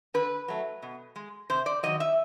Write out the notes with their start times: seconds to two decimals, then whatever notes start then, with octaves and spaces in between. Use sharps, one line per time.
0.14 D3 B4
0.48 F#3 A3
0.82 B2
1.16 G#3
1.50 C3 C5
1.66 D5
1.83 D#3 F#3 D#5
2.00 E5